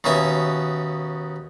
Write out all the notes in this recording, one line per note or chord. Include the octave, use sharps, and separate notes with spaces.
D#2 B2 C#4 E5 D#6